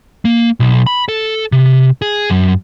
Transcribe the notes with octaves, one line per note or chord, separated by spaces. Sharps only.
A#3
B1
B5
A4
C3
G#4
F#2